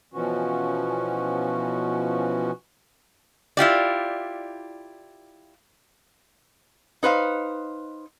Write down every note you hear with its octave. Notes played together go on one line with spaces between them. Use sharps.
B2 E3 F3 C#4 F#4
E4 F4 G4 D5
D#4 B4 C5 F5